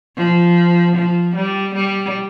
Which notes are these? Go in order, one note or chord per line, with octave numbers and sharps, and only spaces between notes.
F3
F3
G3
G3